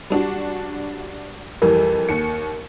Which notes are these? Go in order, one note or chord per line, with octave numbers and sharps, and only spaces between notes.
G3 D4 F#4
F2 E3 G3 A#4
D#2 C#7